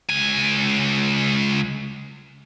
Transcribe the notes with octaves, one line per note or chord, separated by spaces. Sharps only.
C#2 G#5